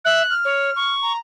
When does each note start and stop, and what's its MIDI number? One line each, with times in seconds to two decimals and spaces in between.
0.05 0.22 76
0.05 0.34 90
0.29 0.94 89
0.45 0.70 73
0.76 1.12 85
1.01 1.18 82